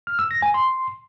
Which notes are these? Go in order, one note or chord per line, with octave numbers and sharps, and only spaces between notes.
F6
E6
A#6
G#5
C6